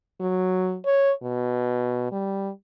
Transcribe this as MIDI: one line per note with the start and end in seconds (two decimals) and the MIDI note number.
0.21 0.78 54
0.86 1.12 73
1.23 2.09 47
2.12 2.50 55